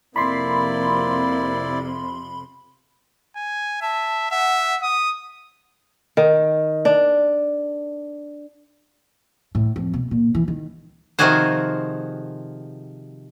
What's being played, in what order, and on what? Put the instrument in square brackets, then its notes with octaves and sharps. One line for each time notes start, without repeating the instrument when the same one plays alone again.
[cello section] F2 C3 [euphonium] A#3 [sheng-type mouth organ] E4 D5 [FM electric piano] B5 C6
[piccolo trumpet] G#5
[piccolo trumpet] E5 [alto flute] A5
[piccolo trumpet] E5 [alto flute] F#5
[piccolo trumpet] D#6
[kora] D#3
D4
[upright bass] A2
F2
B2
A#2
E3
D#3
[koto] C3 D#3 F3 F#4 G#4 C5